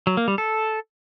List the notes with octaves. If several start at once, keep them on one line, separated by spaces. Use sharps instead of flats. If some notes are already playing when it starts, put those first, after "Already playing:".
F#3
A#3
G3
A4